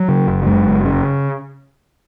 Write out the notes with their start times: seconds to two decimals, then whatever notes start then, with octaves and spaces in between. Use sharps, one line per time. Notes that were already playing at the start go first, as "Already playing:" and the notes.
Already playing: F#3
0.08 C#3
0.27 F#1
0.47 F#2 G#3
0.67 F#1
0.85 C#3